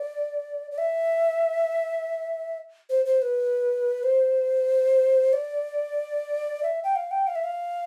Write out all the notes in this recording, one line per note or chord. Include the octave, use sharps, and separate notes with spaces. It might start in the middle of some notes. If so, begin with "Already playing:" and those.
Already playing: D5
D5
E5
C5
C5
B4
C5
D5
E5
G5
F5
G5
F5
E5
F5